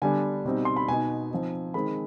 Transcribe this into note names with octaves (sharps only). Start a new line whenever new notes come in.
D3 G3 B3 D4 G#5
B2 G3 C4 D#4
C6
B5
B2 B3 D#4 G#5
F3 C4 D#4
D#3 G#3 C4 D#4 B5